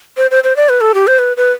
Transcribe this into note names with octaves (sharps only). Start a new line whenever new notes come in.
C5
C5
C5
D5
B4
A4
G4
C5
B4
B4